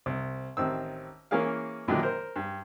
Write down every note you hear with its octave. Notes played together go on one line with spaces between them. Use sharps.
C2
A1 D#3 C4 E6
E3 A#3 C#4 G#4 A#4 F5
A1 F#2 A#2 D3 D#3
A#4 C5
G2